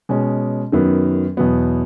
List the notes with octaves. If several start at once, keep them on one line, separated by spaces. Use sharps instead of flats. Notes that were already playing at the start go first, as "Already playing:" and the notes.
B2 G#3 C#4
F#2 D#3 F#3 B3
E2 B2 F#3 B3